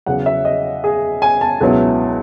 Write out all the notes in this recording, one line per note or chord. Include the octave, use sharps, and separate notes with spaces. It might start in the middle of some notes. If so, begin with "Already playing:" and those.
E2 C#3 F#3 F#5
E5
D#5
G#4
G#5
A5
C#2 B2 F#3 B3 E4